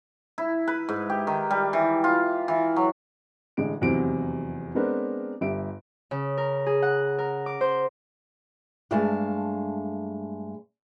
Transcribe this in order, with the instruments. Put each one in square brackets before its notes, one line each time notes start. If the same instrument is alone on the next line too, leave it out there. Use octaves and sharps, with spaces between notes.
[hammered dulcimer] E4
B4
G#2
G4
D#3
G3
E3
F4
E3
F#3
[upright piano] A1 D3 G#3 D7
F1 E2 C3 F#3 C4 D7
G#3 B3 C4 D4 A#4 B4
G1 G4 E5 D7
[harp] C#3
A#4
G#4
F#5
A#4
D6
C5
[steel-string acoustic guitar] G2 G#3 A3 F5 G#5 A5